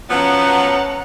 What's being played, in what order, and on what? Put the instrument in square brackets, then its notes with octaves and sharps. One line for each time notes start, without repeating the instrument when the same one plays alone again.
[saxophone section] F3 F#3 B3 [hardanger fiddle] C#4 A5 [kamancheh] F#5 A#5